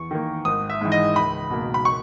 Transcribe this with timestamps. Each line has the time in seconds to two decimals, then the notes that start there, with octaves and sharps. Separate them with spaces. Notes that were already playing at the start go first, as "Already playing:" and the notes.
Already playing: E2 C#6
0.11 D#3 A#3
0.45 G#1 D#6
0.70 E5
0.81 G#2 E3
0.92 D#5
1.16 C#2 B5
1.50 B2 A#3
1.74 B5
1.85 C#6